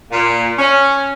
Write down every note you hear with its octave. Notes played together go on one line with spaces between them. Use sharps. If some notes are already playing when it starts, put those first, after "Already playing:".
A#2
C#4